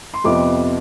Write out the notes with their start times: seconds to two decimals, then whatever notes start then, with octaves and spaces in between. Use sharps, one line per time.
0.14 C6
0.24 F2 C3 F3 B3 D6